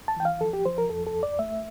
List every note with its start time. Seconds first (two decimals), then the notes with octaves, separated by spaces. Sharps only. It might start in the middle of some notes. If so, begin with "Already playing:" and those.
0.08 A5
0.16 E3 G5
0.25 F5
0.41 F3 A4
0.53 G4
0.65 F3 C5
0.78 A#4
0.90 F2 A4
1.07 A4
1.15 F2
1.23 D5
1.39 A3 E5